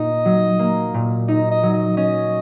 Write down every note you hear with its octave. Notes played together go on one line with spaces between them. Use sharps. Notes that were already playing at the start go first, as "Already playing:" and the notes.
Already playing: A#2 A#3 D#4 D#5
F#3
A#3
A#2
D#4 D#5
D#5
F#3
D#5
C#4 D#5